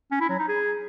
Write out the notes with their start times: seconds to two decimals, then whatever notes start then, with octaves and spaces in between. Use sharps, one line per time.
0.11 C#4
0.21 E4
0.30 F#3
0.39 D#4
0.48 G#4